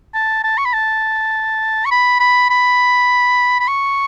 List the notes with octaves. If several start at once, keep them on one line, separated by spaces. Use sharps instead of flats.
A5
A5
C#6
B5
A5
C#6
B5
B5
B5
B5
C#6